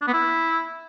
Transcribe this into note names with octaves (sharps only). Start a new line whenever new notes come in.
D4
B3
E4